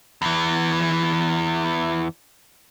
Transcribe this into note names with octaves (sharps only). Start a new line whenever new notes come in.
E2 E3